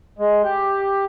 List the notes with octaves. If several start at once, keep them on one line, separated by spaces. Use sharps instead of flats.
G#3
G4